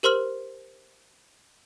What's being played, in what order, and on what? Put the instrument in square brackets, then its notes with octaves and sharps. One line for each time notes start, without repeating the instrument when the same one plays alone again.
[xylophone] G4 A#4 C5 C6 F6 F#7